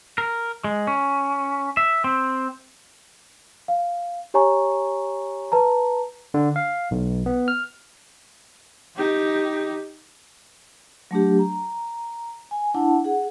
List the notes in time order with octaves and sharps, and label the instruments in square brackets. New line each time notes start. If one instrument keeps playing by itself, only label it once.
[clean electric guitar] A#4
G#3
C#4
E5
C4
[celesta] F5
G4 C#5 G#5 A#5 C#6
B4 A5 A#5
[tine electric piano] D3
F5
B1
B3
F6
[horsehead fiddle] D#4 G4
[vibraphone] F#3 A3 D4 G4
A#5
G#5
D4 E4 F#5 A5
G#4 F#5